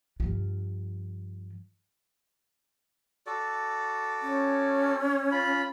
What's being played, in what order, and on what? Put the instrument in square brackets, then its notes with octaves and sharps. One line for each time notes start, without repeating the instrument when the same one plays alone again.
[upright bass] G2 F3
[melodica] F#4 A4 D5
[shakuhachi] C#4
[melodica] F4 B5